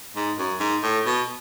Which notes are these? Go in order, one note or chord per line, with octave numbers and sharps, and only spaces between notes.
G#2
F#2
G#2
A2
B2